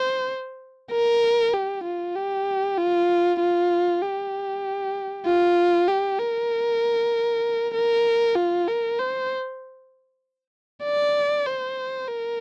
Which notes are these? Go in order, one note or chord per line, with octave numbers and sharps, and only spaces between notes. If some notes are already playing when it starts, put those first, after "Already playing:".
Already playing: C5
A#4
G4
F4
G4
F4
F4
G4
F4
G4
A#4
A#4
F4
A#4
C5
D5
C5
A#4